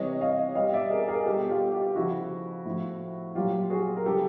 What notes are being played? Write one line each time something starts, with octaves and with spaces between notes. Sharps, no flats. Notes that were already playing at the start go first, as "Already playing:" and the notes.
Already playing: C3 E3 G3 C#5 D#5
D#5 F5
B2 G3 D#5 F5
D5 E5
G#4 A#4
G#4 A#4
B2 G3 G4 A4
F4 G4
F4 G4
C#3 F3 E4 F#4
A2 F3
A#2 F#3 F4 G4
F#4 G#4
A#4
C#3 F#3 G4 A4